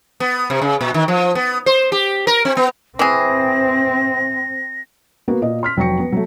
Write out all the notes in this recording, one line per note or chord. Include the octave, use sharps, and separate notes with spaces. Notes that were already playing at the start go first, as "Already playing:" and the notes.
B3
C3
C#3
A#2
D#3
F3
B3
C5
G4
A#4
C4
B3
E3 C4 G#4 A#6
A#3 B3 F#4 A#4 B4
A#2 D#5
C6 F6 B6
F1 F#3 G5 C#6 A#6 C#7
B3
F#3 A3